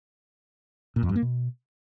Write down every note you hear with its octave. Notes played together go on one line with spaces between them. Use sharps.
A#2
F2
G2
A#3
B2